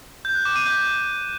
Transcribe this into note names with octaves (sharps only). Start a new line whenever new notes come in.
G6
F#6
D6
D#7
G6